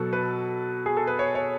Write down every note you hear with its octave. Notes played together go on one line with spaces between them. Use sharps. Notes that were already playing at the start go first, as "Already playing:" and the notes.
Already playing: B2 F#3 F#4 A4
B4
G#4
A4
B4
C#5
C#5